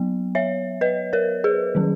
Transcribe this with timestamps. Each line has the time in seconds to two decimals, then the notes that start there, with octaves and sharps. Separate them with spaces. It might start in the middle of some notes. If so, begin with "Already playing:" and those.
Already playing: F#3 B3
0.35 C#5 E5
0.81 B4 D#5
1.13 A#4 C#5
1.44 G#4 B4
1.75 D#3 F#3 C#4